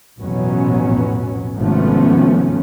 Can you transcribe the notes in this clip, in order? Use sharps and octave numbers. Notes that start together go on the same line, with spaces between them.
A1 F2 B2 F#3 B3 C#4
G#1 C3 F3 A3 B3 C#4